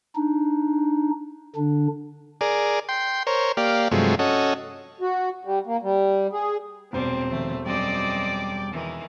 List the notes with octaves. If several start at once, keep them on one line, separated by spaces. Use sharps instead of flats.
D4 D#4
D3 D4
G#4 A#4 D5
G5 C6
A#4 C5 C#5
A#3 G4 D5 F5
G2 C3 F3 F#3 G#3 A3
C#4 F#4 A4 D#5
F#4
G3
A#3
G3
G#4
E1 A#2 G3 C4 C5
D#3 F3 A3
F#2 G3 C4 D5 D#5 G5 D6
D#3 E3